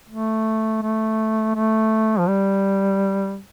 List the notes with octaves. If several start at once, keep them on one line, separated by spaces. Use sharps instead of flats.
A3
A3
A3
F3
G3